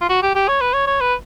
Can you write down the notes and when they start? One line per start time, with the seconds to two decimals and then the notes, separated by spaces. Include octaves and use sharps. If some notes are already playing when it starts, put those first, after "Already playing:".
0.01 F4
0.09 F#4
0.23 G4
0.35 G4
0.48 C#5
0.61 B4
0.74 C#5
0.87 C#5
1.01 B4